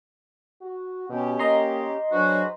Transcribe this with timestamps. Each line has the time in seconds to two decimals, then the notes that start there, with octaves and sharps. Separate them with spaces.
0.62 F#4
1.09 B2 C#4 G4
1.39 A#3 D#5 A#5 C6
2.12 F#3 D4 F#4 G#4 B4 C5